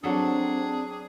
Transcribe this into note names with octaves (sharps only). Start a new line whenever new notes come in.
F#3 C4 D4 G#4 A4